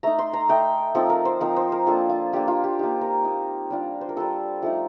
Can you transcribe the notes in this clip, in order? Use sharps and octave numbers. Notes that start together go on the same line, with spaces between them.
A3 D#4 A#5
C6
A#5
A3 D#4 G5
F3 C4 D#4 A4
A#4
C5
F3 C4 D#4 A#4
C5
A#4
A#3 D4 F4 A4
F4
A#3 D4 F4 G4
F4
G4
A#3 D#4 G4
A#4
A#3 D#4
G3 D4 F4
C5
A#4
G3 D4 F4 A4
F3 A3 D#4 A4